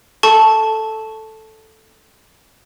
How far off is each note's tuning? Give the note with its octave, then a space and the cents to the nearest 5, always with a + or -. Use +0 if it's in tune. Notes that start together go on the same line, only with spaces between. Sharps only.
A4 +0 A5 -5 C#6 +0